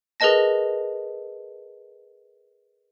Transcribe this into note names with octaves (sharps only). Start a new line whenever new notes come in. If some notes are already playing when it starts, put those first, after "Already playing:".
G#4 A#4 B4 D#5 A5 A#6